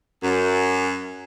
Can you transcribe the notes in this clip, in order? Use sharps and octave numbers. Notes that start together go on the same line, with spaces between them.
F#2